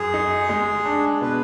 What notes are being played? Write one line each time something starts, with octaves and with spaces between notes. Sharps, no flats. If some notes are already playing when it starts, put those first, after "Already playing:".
Already playing: F#2 G#4
D#4
G#3
D4
B2 B4